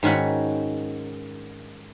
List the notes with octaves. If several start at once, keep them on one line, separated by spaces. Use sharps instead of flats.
G#2 D#3 C#4 F#4 B5